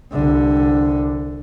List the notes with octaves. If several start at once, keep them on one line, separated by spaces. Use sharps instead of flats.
C2 D3